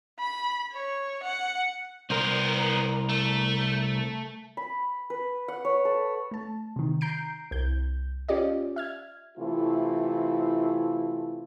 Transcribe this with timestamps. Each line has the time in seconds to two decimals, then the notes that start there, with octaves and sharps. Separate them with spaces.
0.20 B5
0.73 C#5
1.23 F#5
2.10 C2 B3 A#4 C5
3.09 A3
4.57 B5
5.10 B4
5.48 F#5
5.65 C#5
5.85 A4
6.31 A3 A5
6.76 C3 D#3
7.01 A#5 G6 C7 D7
7.51 C2 G6
8.29 C#4 F4 G4 D5 D#5
8.76 E5 F6 G#6
9.38 C3 E3 A3 E4 F4